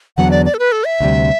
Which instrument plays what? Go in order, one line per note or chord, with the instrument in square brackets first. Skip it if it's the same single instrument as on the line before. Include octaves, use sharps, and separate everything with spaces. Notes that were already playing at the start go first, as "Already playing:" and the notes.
[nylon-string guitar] E2 D3 F#3 B3 [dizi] F#5
[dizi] D5
D5
A4
B4
A4
E5
[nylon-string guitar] D2 C3 G3